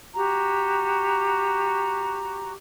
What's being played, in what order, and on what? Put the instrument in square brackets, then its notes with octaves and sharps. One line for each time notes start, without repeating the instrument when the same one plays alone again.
[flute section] F#4 G4 A#5